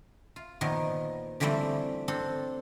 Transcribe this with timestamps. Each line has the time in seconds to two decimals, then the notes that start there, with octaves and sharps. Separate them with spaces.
0.36 F4
0.61 A#2 D#3 F3 B3
1.40 D3 E3 F3 G3 A3 C4
2.08 C4 D4 A4